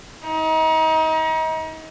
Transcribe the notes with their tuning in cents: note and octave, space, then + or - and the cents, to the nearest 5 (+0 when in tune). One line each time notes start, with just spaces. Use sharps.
D#4 +35